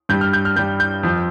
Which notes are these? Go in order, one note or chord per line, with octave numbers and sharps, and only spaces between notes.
G2 G3 G6
F6
G6
F6
G2 G3 G6
G6
F2 F3